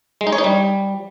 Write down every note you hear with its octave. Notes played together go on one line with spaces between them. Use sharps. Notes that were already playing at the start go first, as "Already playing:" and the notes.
G#3
D#4
C#5
D#4
G3